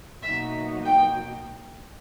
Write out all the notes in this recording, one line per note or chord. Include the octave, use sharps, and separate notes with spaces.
B2 F#3 A#3 D#4 F#4 E5
G5